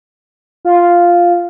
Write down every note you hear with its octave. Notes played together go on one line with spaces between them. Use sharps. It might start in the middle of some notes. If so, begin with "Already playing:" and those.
F4